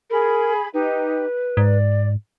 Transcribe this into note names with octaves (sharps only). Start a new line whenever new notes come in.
G#4 A#4 B5
D#4 G4 B4
G#2 D5